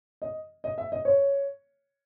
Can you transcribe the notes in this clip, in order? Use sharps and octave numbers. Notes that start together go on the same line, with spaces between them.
D#5
D#5
E5
D#5
C#5